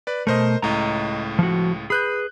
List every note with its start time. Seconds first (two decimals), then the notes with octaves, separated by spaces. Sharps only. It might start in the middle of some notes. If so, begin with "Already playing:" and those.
0.07 B4 D5
0.27 B2 A3 A#4 C5 D#5
0.62 C#2 A2 D#5 A#5
1.39 F3 F#4
1.90 G#4 B4 B5 F#6 G6